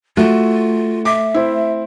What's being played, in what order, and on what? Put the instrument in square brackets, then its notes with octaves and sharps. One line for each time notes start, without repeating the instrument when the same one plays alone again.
[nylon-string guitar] A3 [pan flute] F4 [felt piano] F#4
[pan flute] E5 [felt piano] D6
[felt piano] C4 E4